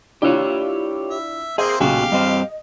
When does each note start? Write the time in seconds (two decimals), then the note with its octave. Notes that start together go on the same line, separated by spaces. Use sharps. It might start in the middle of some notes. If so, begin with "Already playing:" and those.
0.22 D4 E4 F4 G4 C#5
1.10 E5
1.58 A#3 C4 G#4 C5 E5
1.80 B1 A#2 C#3 F#4 G4 F5 G#5
2.12 G2 C4 D#5